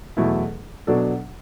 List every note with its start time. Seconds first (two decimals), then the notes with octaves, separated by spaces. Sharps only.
0.17 E2 B2 F#3 A3 E4
0.87 B2 F#3 D4 A4